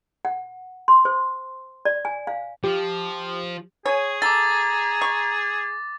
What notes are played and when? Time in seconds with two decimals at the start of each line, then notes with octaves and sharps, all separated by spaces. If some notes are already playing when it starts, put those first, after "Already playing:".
0.25 F#5
0.88 C6
1.05 C5
1.85 D5
2.05 G#5
2.27 F5
2.64 F3 G4
3.86 G#4 C#5 G#5
4.22 A4 A#5 D6 A6
5.01 C#6